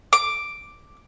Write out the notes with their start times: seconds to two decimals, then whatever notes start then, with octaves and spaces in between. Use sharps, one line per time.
0.13 D6